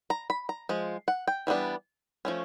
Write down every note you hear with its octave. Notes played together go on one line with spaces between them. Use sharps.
A#5
B5
A#5
F3 G#3
F#5
G5
E3 G3 B3 D4
F3 A3 C#4